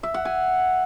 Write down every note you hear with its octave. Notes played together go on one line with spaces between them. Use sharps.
E5
F#5
G#5